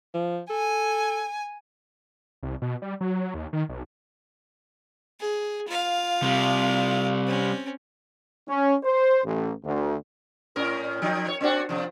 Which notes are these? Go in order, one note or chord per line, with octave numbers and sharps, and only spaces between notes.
F3
A4 G#5
C2
B2
G3
F#3
D#2
D#3
B1
G#4
F4 F5
C3 G3
C4 C#4
C#4
C5
A1
D2
A2 C#4 A#4
F3 D#4
C#5
C4 D4 F#4
C3 F3